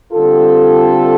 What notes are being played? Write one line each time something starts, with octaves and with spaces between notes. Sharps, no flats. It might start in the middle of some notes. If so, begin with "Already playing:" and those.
D3 G3 C4 F4 A4